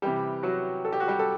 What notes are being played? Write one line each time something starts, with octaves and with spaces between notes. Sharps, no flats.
C3 E3 G3 G4
F#3 F#4
A4
G4
F#4
G3 G4
A4